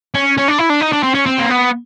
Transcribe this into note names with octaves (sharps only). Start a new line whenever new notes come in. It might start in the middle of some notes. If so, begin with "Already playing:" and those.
C#4
C#4
D4
E4
D4
D#4
D4
C4
C#4
C4
A#3
B3